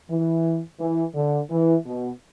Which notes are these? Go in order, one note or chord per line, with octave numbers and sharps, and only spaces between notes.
E3
E3
D3
E3
B2